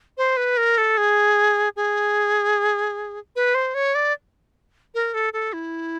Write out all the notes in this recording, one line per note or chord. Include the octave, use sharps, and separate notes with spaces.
C5
B4
A#4
A4
G#4
G#4
B4
C5
C#5
D5
A#4
A4
A4
E4